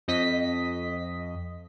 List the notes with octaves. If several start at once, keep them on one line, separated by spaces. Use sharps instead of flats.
F2 D#5 B6